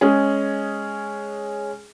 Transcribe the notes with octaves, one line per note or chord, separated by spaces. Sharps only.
G#3 C#4 G#4